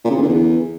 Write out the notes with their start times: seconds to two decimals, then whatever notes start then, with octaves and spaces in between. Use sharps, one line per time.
0.05 A#2
0.11 C#3
0.16 E2
0.22 D3
0.28 E2